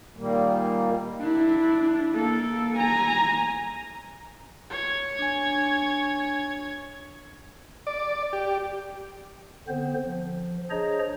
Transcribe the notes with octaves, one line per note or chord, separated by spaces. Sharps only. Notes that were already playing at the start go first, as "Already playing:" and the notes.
A#2 D#3 G3 A#3
D4 E4
A#3 A4
G#5 A#5
C#5 G#6
D4 G#5
D5
G4
D3 B3 C4 C5
F3
D4 G#4 C5 C#5 D#5 A#5